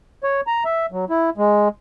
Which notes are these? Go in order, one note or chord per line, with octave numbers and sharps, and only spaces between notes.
C#5
A#5
E5
F#3
E4
G#3